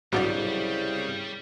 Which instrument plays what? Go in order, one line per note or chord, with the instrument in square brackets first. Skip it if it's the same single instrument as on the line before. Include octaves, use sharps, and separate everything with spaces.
[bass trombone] C2 [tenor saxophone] C#3 [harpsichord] F#3 D4 D5 [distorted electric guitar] G3